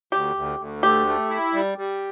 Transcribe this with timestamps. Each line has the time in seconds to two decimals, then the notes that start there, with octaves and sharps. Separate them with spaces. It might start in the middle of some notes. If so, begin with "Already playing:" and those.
0.12 D2 G4
0.36 D2
0.59 D2
0.83 A3 G4
1.07 A3
1.30 E4
1.53 G3
1.78 G3